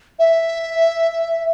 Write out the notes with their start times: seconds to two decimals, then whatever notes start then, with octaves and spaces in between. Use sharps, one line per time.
0.19 E5